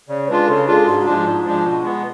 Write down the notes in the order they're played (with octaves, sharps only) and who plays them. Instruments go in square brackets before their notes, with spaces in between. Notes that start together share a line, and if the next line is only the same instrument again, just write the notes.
[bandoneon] C#3 [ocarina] D5
[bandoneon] G#3 D4 F4 [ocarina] B4
[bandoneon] C#3 [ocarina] A4
[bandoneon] G#3 D4 F4 [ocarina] G#4
[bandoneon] G#2 [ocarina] F#4
[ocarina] F#4
[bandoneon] F3 G#3 D4 [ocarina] F4
[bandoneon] G#2
F3 G#3 D4
B2
G#3 B3